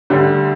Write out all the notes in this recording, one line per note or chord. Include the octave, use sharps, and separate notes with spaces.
D2 D3 G3